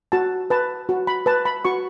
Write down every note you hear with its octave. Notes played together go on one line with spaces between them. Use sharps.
F#4 A5
B4 A5
F#4
B5
B4 A5
B5
F#4 C#6